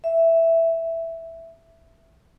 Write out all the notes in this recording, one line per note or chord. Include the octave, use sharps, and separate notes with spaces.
E5